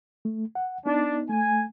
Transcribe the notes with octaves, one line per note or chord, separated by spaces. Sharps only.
A3
F#5
B3 D4 D#4
A3 G#5